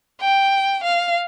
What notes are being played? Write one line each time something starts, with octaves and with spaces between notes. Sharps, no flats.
G5
F5